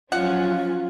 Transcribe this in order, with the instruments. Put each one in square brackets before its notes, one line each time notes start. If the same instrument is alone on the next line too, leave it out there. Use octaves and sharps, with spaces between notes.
[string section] F3 F#3 C#4 [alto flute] F4 [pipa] F#5